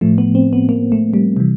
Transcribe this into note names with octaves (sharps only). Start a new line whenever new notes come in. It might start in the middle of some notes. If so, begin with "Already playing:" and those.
A2 F3 A3
B3
C4
B3
A#3
A3
G3
C3 E3